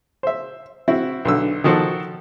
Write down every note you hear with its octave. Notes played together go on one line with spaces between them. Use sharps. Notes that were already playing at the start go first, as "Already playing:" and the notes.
C5 E5
C4 E4 F#4
B1 D3 E6
D#3 F3 F#4 A4 C5